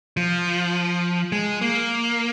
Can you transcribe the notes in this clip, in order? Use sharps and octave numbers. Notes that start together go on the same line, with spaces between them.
F3
G#3
A#3